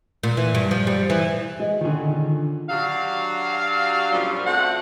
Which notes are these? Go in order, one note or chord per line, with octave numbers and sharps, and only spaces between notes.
A#2
E3
G2
F3
G3
E3
G#3 D#5
A#2 D3 D#3 C#4 G#4
F#3 D4 F#4 G4 F5
F#2 A#2 C#3 F3 G3 C#4
A3 C4 F#4 F#5